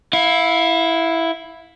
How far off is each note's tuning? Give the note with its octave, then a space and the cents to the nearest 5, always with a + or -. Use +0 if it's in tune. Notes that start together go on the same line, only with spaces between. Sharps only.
E4 +0 F5 +30